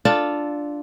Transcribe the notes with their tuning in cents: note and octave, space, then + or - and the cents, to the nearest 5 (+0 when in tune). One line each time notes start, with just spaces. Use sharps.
D4 +0 F4 +0 A4 +0